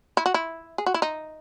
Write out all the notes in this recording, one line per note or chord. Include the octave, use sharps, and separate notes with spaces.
E4
F#4
E4
G#4
F#4
E4
D#4